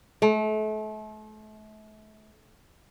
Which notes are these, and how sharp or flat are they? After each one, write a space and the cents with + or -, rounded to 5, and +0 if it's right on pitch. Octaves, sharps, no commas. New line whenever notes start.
A3 -35